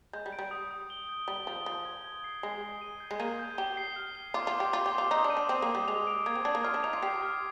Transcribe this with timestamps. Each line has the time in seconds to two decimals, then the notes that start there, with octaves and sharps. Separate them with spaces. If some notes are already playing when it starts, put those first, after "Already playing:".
0.13 G#3 G6
0.26 G3
0.32 D7
0.39 G3
0.51 D#6
0.71 D#6
0.90 G7
1.09 G6
1.28 G3 G7
1.47 F3 G7
1.66 F3 G7
1.85 G#6
2.04 G#6
2.24 C7
2.43 G#3 C7
2.62 C7
2.81 D#7
3.00 G6
3.11 G#3
3.20 A#3 D#7
3.39 G6
3.58 G4 G7
3.77 C7
3.96 F6
4.15 G7
4.34 F4 D6
4.47 F4
4.54 D6
4.60 G4
4.73 F4 D6
4.86 G4
4.92 D6
4.98 F4
5.11 D#4 D#6
5.24 D4
5.30 D#7
5.37 D4
5.49 C4 D#6
5.62 A#3
5.69 D#6
5.75 G3
5.88 G#3 F7
6.07 D7
6.26 A#3 G#6
6.36 C4
6.45 D4 G#6
6.55 A#3
6.64 F4 F6
6.74 D4
6.83 D#4 F7
6.93 F4
7.02 G4 C7
7.22 F6